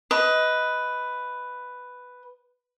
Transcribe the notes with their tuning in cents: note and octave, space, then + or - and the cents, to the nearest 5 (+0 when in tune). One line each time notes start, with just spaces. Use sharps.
B4 +5 D#5 +20